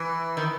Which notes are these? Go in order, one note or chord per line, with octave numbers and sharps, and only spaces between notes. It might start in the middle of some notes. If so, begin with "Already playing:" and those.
Already playing: E3
D#3